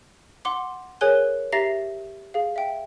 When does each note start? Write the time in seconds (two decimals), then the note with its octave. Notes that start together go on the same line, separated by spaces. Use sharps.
0.45 F#5 C6 D6
1.01 G#4 A#4 C#5 G#5 F#6 G7
1.52 G4 E5 A#5 A6 A#6 C7
2.34 G#4 F5
2.56 E5 G5